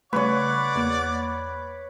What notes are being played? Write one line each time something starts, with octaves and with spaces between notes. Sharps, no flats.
C#3 G3 A3 B4 C#5 D5 F#5 D6
E2 A#3 D7